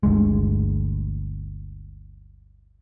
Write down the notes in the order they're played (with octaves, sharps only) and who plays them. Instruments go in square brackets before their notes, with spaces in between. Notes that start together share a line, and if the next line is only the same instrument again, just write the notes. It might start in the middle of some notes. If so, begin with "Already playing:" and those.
[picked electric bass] G1 D2 G#3